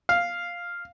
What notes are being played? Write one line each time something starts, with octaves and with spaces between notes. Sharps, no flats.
F5